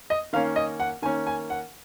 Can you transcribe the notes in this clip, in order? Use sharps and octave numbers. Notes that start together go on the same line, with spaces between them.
D#5
D#3 A#3 C#4 F5
D#5
F#5
D#3 A#3 C#4 G#5
G#5
F#5